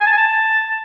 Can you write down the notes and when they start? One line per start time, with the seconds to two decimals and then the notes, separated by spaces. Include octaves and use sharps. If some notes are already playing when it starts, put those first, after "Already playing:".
0.01 G#5
0.06 A5
0.12 G#5
0.17 A5